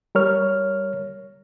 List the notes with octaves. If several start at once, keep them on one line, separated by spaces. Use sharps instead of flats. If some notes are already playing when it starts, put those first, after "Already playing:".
G3 A#4 C#5 F6